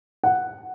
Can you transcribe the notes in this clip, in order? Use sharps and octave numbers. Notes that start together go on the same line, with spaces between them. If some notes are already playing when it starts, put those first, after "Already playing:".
F#5